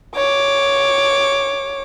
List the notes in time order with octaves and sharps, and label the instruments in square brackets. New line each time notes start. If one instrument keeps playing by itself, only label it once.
[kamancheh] C#5 D6